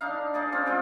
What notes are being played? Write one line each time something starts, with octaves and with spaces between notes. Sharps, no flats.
D4 D#4 F5
D#4 G#4 D5
C4 C#4 F4
G#3 F4 G5